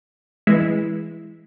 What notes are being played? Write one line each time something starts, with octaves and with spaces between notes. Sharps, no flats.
E3 G#3 E4